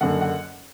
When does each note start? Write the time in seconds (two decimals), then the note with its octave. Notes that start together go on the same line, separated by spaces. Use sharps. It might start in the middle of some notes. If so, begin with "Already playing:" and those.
0.01 F#1 F#2 D3 F#5
0.21 F#5